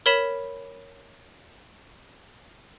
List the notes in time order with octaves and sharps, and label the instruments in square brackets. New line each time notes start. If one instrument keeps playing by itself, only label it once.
[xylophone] A#4 C#5 B5 B6 E7